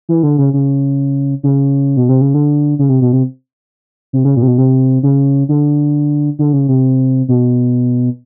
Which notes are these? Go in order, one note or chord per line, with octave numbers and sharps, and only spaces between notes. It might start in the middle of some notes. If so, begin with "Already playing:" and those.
E3
D3
C#3
C#3
C#3
B2
C3
C#3
D3
C#3
C3
B2
C3
C3
C#3
A#2
C3
B2
C3
C#3
D3
D3
C#3
C3
B2